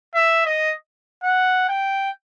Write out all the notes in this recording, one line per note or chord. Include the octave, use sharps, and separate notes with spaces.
E5
D#5
F#5
G5